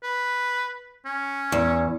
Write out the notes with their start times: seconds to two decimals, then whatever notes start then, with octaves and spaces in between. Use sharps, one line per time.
0.03 B4
1.05 C#4
1.52 E2